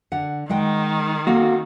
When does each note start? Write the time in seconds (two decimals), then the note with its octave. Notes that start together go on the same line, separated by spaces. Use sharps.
0.12 D3 F#5
0.49 D#3 G#3 F#5 G5
1.27 A#3 C4 F#4 A4